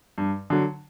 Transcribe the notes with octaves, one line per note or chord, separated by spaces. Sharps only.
G2
D3 F#3